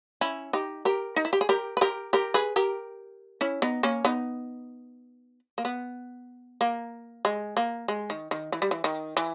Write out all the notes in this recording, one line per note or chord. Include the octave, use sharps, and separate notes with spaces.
C#4 E4
D#4 G4
G4 A#4
D#4
E4
G4
G#4
G4 A#4
B4
G4 A#4
G4 A#4
G#4 B4
G4 A#4
C#4 E4
B3 D#4
A#3 C#4
B3 D#4
A#3
B3
A#3
G#3
A#3
G#3
D#3
D#3
E3
G3
E3
D#3
E3